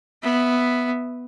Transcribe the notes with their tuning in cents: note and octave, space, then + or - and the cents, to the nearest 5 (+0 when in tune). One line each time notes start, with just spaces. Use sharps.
B3 +0 E5 +0